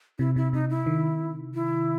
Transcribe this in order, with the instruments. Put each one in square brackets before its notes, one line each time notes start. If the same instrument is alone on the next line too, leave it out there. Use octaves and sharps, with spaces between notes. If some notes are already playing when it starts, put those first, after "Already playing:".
[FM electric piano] C3 [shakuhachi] E4
[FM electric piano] C3 [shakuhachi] E4
[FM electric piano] C3 [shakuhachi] D#4
[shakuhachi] E4
[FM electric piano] D#3
[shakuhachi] E4